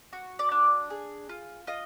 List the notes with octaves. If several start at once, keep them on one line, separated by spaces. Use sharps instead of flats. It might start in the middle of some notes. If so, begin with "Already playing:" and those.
F#4
D5
D4
G#4
F4
F4 D#5